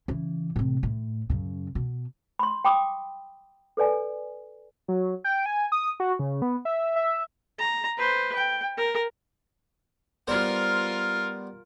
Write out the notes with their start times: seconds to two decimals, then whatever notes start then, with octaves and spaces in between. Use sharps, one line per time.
0.08 C#3 E3
0.56 A2 C3
0.83 A2
1.30 F#2 C#3
1.75 B2
2.39 B5 C6
2.65 G5 B5 D6 D#6
3.77 A4 B4 D5 G#5
4.88 F#3
5.24 G5
5.46 G#5
5.72 D#6
6.00 F#4
6.19 C#3
6.42 B3
6.65 E5
6.96 E5
7.59 A#5
7.98 B4 C5
8.35 G5
8.77 A#4
10.27 G3 B3 F4 A#4 C5